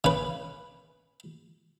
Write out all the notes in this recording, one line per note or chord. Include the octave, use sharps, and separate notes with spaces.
C#3 B4